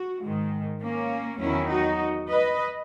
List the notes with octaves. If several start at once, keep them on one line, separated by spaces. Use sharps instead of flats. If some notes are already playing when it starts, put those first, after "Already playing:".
Already playing: F#4
G#2 D#3 G#3
A#3 C#4
E2 D#3 F#3 C#4 E4
D#4 F#4
B4 D#5